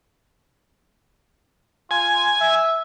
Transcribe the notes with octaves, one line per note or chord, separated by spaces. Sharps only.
F4 G#5
E5